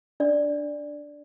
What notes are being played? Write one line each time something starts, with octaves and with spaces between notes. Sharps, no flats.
D4 D5